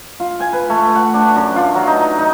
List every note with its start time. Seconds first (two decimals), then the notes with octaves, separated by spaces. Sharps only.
0.20 F4
0.40 G#5
0.53 B4
0.70 A3
0.95 F#5
1.14 D4
1.36 F#2
1.56 F4
1.75 F#3
1.87 D#4
2.18 D#4